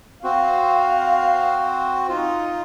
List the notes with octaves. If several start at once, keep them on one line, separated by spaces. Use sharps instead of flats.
C4 F#4 F5
D#4 F4